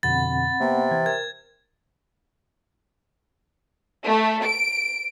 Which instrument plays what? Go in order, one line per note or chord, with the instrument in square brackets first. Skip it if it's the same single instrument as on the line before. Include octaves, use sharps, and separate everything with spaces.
[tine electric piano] F2 B2 D3 [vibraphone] C4 F#5 B5 [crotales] A6
[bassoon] C3 [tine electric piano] A#3 B3
[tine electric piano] E3 G#6
[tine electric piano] A#4 [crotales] G#6
[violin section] A3
D7